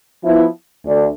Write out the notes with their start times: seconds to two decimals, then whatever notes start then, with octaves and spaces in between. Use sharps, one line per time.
0.23 F3 B3 E4
0.85 D2 D3 A3 D4